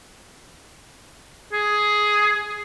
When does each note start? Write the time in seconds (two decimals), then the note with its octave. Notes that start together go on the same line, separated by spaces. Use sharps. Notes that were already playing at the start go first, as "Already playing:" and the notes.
1.53 G#4